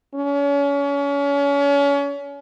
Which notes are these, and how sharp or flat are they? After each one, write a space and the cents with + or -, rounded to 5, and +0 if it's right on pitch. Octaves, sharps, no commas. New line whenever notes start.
C#4 +35